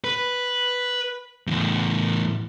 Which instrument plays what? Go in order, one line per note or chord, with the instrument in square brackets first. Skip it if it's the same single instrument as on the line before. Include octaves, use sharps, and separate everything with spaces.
[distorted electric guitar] B4
E2 A2